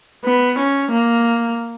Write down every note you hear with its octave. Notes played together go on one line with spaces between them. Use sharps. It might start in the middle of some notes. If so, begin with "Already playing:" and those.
B3
C#4
A#3